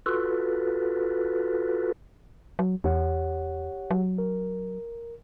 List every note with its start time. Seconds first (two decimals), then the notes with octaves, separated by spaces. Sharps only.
0.06 F4 F#4 A4 B4
2.59 F#3
2.84 E2 G4 C#5 F#5
3.91 F#3
4.18 A#4